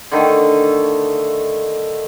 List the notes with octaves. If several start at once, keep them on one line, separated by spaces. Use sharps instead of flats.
D3 D#3 A3